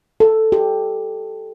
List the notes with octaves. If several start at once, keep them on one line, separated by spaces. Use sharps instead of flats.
A4
G4